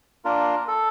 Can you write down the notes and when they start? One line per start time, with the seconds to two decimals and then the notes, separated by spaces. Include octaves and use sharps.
0.25 A#3 D4 F4 A#4
0.68 A4